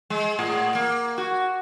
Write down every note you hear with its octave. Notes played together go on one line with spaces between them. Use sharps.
G#3
A2
A#3
F#4